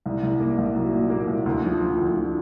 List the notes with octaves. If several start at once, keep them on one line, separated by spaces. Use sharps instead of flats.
C2
C2
A#3
C2
F#3
A#2
A#3
C2
D2
F3
F3
D2
F3